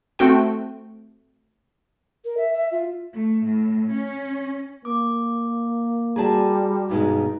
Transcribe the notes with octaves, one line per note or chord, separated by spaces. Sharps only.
A3 C4 F#4 G5
A#4
E5
E5
F4
A3
A2
C#4
A#3 D6
G3 F#4 G#4 D5 A5 A#5
G2 B2 G#3 D#4